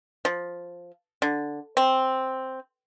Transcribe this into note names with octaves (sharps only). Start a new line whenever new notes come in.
F3
D3
C4